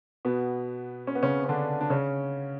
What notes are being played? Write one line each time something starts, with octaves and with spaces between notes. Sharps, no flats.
B2 B3
C#4
B3
C#3 C#4
C#4
D3 D4
D4
C#3 C#4